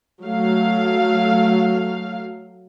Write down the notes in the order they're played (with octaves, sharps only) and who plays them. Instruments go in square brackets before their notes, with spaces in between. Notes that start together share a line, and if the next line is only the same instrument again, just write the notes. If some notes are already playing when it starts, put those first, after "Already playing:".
[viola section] F#3 A3 F5